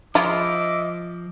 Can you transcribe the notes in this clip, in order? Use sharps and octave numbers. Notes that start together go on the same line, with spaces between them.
F3 G#3 E4 F4 D#5 E5 D6